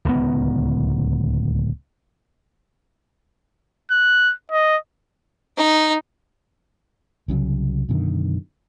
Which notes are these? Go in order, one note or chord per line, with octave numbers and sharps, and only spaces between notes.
D1 C#2 D#3 B3
F#6
D#5
D#4
C2 C#3 F3 F#3
F#2 B2 D3 D#3